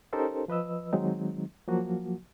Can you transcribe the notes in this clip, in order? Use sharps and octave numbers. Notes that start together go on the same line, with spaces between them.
C#4 D#4 G4 A4 A#4 C5
F3 B4 D#5 E6
D#3 F#3 G#3 C4 D#4
F3 F#3 A#3 F#4